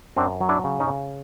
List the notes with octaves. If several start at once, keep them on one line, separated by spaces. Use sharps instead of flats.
F#2 C4 D4
F#3
D4 E4
C#3
C#4 D#4
C#3